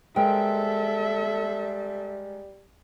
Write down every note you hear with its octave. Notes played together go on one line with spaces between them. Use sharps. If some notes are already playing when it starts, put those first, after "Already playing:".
G3 G#3 A4 A#4 C5 E5 G5